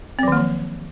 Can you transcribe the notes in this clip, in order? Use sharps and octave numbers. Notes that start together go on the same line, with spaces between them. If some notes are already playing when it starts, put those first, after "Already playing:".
D#3 F3 F#3 A#3 C4